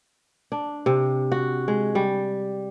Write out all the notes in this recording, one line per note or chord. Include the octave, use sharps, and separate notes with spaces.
D4
C3
F#4
G#3
G3